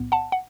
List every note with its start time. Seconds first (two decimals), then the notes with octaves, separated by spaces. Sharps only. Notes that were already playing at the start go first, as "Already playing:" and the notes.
Already playing: B1 A2 B3
0.12 F#5 A5
0.32 F#5